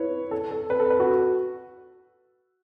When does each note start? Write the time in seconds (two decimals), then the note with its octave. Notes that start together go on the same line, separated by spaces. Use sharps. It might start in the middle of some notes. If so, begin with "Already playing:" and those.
Already playing: E4 B4 C#5
0.31 A4
0.51 A4
0.70 B4
0.80 A4
0.90 B4
1.00 F#4